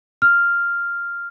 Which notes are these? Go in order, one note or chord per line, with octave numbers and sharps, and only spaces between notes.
F6